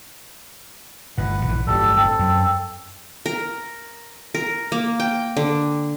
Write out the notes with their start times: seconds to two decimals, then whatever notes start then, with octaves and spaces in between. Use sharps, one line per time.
1.18 G1 A2 B4 F#5
1.45 A#1 E3
1.67 D1 G1 D2 G3 A4
1.96 C4 A4
2.19 F#2
3.26 A#4
4.35 A#4
4.72 A#3
5.00 G5
5.37 D3